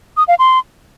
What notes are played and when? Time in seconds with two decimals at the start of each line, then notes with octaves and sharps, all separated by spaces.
0.17 D#6
0.28 F5
0.39 C6